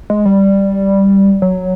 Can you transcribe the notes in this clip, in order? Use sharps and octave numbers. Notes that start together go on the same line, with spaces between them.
G#3
G3
F#3